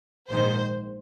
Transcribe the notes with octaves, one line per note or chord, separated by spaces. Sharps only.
A#1 G#2 D#3 C5